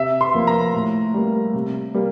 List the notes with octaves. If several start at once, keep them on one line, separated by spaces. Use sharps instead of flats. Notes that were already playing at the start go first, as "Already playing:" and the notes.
Already playing: C3 E5
C6
F3 A#3
A#5
A2
G3 A#3
C3
G3 A#3